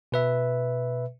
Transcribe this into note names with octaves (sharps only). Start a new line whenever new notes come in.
B2 B4 E5